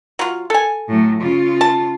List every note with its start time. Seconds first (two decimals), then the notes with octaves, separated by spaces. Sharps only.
0.19 F#3 F4
0.50 A4 G#5
0.88 A2 F#3
1.21 C#3 F4
1.61 A5